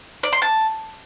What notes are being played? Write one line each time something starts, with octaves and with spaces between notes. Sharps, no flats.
D5
C6
A5